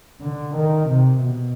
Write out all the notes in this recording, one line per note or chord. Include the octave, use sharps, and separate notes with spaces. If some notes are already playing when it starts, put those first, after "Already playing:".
D3
D#3
C3
B2